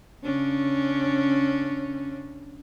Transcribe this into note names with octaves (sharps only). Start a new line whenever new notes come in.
C#3 C#4 D4